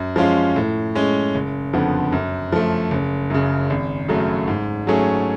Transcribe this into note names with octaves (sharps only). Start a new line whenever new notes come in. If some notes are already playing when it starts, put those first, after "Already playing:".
Already playing: F#2
F3 G#3 C#4 F4
A2
G#3 C#4
F#1
F2 D3 F3 B3
F#2
F3 A3
F#1
F#2 C#3
G#1
F#2 C#3 F#3 A3
G#2
F#3 A3 C#4 G#4